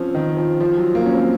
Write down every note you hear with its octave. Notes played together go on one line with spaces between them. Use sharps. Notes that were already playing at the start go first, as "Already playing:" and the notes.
Already playing: F3 C4 C#4
D#3
F3
F3
F#3
A#3
C#4
C4